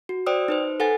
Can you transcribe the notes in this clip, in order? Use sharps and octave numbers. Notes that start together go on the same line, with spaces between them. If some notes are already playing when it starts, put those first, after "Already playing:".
F#4
C5 D5 G5 D#6 E6
D#4 B4 C5
A4 B4 F#5 G#5 A6